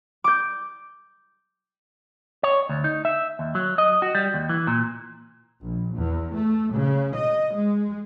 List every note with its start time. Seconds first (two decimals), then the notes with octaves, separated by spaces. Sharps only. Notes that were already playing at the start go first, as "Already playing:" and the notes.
0.24 D6 G6
2.43 C#5
2.69 D2
2.84 D#4
3.05 E5
3.39 D#2
3.55 F#3
3.78 D#5
4.02 F#4
4.15 G3
4.34 D#2
4.49 E3
4.67 A#2
5.62 A#1
5.96 E2
6.34 A3
6.75 C#3
7.17 D#5
7.57 G#3